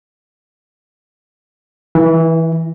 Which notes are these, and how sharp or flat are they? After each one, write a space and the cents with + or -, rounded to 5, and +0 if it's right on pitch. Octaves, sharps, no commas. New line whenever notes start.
E3 -20 E4 +25